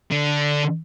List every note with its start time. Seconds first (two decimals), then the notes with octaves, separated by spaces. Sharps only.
0.11 D3